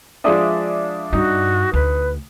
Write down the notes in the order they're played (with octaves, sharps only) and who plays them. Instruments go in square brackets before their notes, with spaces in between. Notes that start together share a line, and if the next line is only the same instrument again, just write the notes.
[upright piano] F3 G#3 D#6 [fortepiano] D4 D5 E5
[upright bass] G2 [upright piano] D#4 [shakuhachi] F#4
[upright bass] D2 [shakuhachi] B4